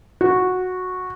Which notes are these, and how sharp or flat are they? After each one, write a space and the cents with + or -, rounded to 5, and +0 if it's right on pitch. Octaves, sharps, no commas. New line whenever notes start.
F#4 -10